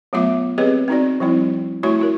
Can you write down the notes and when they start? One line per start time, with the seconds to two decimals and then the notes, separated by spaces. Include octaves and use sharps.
0.13 F#3 A3 B3 F4 E5 D6
0.58 C4 G4 G#4 B4 C#5 D#5
0.88 C4 D#4 F#4 D5
1.20 F3 G3 C4 E4
1.83 A3 E4 F#4 C#5 C#6
1.99 E4 F#4 A#4